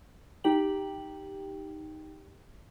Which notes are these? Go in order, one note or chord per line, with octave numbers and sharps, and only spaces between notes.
D#4 G4 G5 F#7